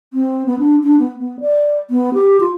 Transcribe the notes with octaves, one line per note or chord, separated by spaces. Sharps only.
C4
B3
D4
D4
B3
B3
D5
B3
G4
F4